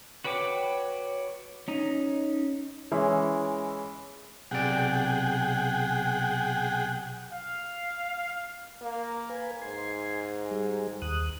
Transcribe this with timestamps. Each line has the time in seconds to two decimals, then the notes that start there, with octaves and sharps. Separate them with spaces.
0.24 F#4 B4 C#5 G5 D6
1.68 C#4 D#4
2.92 E3 G#3 C#4 E4
4.51 B1 C3 G#4 D5 F#5 G5
7.32 F5
8.82 A#3
9.30 B4 G#5
9.62 G#2 G#5 C6
10.51 G3 G#4
11.02 D#2 D#6 F#6